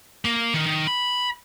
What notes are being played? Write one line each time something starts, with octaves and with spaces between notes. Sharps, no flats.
A#3
D#3
D#3
B5